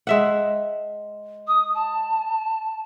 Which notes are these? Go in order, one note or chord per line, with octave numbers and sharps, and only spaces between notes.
G#3 E5 F#5
D#6
A5